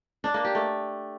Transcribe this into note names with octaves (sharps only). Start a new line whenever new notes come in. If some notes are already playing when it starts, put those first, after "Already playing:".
D4
A#3
G4
A3